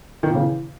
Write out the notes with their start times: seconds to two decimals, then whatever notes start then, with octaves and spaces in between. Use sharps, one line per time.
0.23 D#3
0.29 A#2
0.35 C#3
0.41 E3